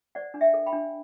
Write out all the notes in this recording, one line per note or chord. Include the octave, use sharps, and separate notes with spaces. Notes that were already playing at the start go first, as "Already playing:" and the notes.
C5 D5 F#5
D4
E5 G5
A4
G5 B5
D4